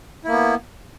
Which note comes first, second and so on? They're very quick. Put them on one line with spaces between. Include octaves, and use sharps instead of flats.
E4 A#3 B3